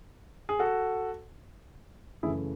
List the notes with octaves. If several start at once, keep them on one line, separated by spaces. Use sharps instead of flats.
G#4
F#4 A4
F#2 C#3 E3 A3 E4 G#4